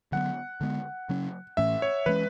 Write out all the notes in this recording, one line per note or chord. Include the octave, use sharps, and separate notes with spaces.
D3 F#3 B3 F#5
D3 G#3 B3
C#3 F#3 C#4
A2 E3 A3 C#4 E5
C#5
E3 G#3 C#4 B4